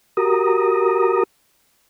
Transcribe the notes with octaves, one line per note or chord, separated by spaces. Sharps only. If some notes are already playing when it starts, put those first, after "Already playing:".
F#4 G4 A#4 A#5 D#6